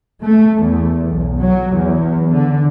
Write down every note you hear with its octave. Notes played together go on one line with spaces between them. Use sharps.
A3
E2
B1
F#3
E2
D3